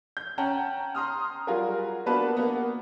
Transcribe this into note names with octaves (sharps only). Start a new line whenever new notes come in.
G6
C#4 F#5 G5 A5 A#5
A#5 C6 D#6 F6
F#3 G3 F4 F#4 G#4 A#4
A#3 B3 D4 F#4 B4 A5
A#3 B3